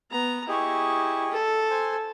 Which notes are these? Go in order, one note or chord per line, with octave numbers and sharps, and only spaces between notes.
B3 A#5
E4 G4 G#4 D#5 C#6
A4
C5 G#5